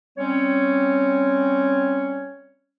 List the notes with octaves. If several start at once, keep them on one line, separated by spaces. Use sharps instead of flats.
G3 C4 C#4 C#5